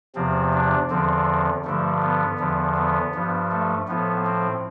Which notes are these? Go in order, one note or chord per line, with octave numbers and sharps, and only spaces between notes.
E2 C3 F3 C4
D4
E2 D3 F3 C4
G2 D3 F3 A3
B3
E2 D3 F3
B3
G2 F3
A3
A2 F3 B3
C4